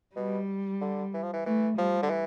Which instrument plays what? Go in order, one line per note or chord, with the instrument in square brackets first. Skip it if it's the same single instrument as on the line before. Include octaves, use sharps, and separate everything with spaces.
[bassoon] B2 [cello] G3
[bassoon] D3
E3
F3
E3
[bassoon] E3 [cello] A3
[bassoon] F3 [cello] G3
[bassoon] D3
E3